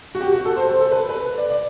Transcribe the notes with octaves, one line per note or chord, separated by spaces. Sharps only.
F#4
G4
F#4
A4
C5
C5
A4
B4
B4
D5
D5